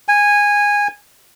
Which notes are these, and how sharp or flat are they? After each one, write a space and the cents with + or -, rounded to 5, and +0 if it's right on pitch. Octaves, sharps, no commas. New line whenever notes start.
G#5 -15